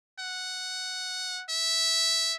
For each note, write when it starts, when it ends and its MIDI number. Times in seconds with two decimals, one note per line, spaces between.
0.19 1.43 78
1.49 2.36 76